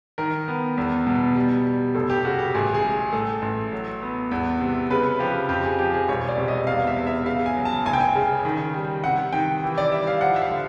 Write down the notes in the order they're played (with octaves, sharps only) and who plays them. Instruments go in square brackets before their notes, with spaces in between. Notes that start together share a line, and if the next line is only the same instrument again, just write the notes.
[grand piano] D#3 A#4
B3
E2
B2
G3
G3
F1 A4
G4
C#3 F#4
G4
A1 G#4
G#4
G#3
A2 A4
A1
F#3
B3
E2
C3
C#3 B4
F3 G4
F2 G4
G#4
F3 G4
G#4
E1 C#5
D5
C3
D#5
E2 F5
E5
E2
E5
C#3 F5
G#5
F#3
A5
F1 G#5
G5
G#5
C#3
D#3
G3
C3 F#5
D#3 G5
E3
D5
G3 E5
F5
F3 F#5
E5
F5
D3